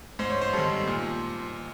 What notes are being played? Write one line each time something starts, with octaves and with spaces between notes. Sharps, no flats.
G#2 C5
C#5
C5
D#3 G3 A4
A#2